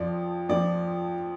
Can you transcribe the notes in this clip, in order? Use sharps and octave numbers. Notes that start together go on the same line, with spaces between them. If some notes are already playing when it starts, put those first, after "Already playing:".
Already playing: F2 F3 D5
F2 F3 D5